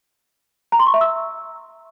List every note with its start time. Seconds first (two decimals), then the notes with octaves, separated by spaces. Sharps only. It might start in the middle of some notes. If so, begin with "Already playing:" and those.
0.72 A#5
0.79 C6
0.87 C#6
0.94 E5
1.01 E6